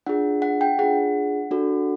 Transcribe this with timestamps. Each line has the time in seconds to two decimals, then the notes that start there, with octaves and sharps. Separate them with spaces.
0.06 D4 F4 G#4 F#5
0.42 F#5
0.61 G5
0.79 D4 F4 G#4 F#5
1.51 D4 F#4 A4